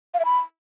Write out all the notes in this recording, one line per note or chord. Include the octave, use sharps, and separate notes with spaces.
F5
E5
B5